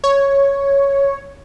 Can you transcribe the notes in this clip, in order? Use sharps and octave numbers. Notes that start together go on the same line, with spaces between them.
C#5